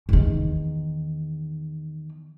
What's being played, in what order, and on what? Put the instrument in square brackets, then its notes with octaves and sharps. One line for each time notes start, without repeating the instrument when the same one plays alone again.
[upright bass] E2 D#3